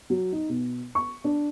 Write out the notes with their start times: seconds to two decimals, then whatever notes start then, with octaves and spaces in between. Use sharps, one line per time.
0.10 F#3
0.32 D#4
0.49 B2
0.95 C#6
1.24 D4